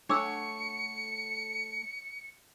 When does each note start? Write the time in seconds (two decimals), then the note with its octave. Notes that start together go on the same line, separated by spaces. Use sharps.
0.09 A3 D4 A4 C#5 F#5 D6 E6 C#7